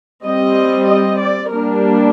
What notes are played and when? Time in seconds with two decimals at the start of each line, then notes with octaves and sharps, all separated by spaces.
0.24 G3 C4 D#5
0.87 D#5
1.20 D5
1.51 G3 A#3 D4 A#4